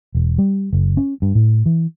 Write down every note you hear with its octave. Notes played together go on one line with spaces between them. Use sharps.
E1
G3
F#1
C#4
G2
A2
E3